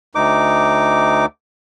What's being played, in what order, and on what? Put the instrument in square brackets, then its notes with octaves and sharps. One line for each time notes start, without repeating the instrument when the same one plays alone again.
[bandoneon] D2 D#4 D6